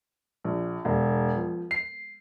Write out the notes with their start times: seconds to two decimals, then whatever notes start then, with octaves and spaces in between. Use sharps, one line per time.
0.44 A#1
0.85 E1
1.36 F3
1.71 C7